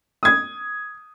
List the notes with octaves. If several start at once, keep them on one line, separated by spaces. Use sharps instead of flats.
D#6 G#6